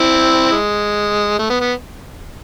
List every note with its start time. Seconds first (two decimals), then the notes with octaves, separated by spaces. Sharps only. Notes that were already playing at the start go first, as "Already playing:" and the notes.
Already playing: C4 E4
0.51 G#3
1.39 A3
1.50 B3
1.61 B3